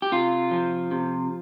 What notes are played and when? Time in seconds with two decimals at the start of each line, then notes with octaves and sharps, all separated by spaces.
0.02 G4
0.12 C3 F4
0.51 F3
0.91 C3